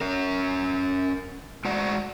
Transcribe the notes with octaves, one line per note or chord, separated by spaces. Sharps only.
C#4 A#4
G#3 F#4 D5 F#5